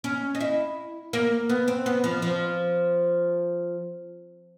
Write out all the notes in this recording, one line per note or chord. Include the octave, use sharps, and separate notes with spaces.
C#4
D#4
E4
A#3
B3
C4
B3
F3
F3